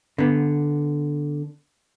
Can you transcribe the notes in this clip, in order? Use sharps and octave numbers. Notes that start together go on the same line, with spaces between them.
D3 B3